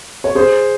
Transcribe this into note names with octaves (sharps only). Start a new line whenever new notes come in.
C#5
G#4 C5